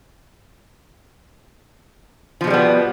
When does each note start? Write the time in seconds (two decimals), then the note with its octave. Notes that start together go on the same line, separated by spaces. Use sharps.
2.41 F3
2.44 B2
2.47 G#3
2.50 G3
2.54 B3